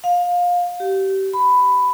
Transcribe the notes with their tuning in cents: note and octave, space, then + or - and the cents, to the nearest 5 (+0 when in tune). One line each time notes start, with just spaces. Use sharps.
F5 +20
G4 -30
B5 +10